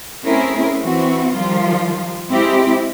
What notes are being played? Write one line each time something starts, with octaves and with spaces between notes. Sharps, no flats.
A3 C4 C#4 E4 G#4 A#4
E3 C4 E4 F#4
D#3 F3 G3 F4
G#3 C4 E4 G4